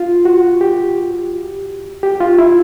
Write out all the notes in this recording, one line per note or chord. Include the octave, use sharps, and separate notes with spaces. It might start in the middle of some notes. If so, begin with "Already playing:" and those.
Already playing: F4
F#4
G4
G4
F4
E4